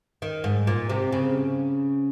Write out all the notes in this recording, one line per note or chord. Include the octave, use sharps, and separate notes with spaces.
D#3
G#2
A#2
C3
C#3